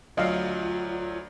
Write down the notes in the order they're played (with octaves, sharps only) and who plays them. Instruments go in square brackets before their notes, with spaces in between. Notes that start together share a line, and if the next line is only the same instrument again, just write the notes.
[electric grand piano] D2 F#3 D5 [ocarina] F4 [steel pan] D#5 F5